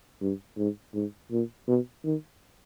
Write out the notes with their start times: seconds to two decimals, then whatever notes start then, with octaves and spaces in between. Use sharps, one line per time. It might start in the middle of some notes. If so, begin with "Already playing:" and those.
0.21 G2
0.57 G#2
0.94 G#2
1.31 A#2
1.68 B2
2.04 D#3